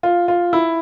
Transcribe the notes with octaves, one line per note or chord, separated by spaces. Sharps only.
F4
F4
E4